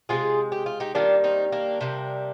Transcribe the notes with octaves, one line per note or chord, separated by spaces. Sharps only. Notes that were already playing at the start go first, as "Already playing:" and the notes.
C3 F3 G#3 F4 G#4
G4
F4
D#4 G4
D#3 G3 A#3 D4 F4
C4 D#4
A#3 D4
C3 G3 A#3